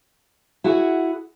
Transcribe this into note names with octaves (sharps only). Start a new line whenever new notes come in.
E4 F#4 G#4 F#5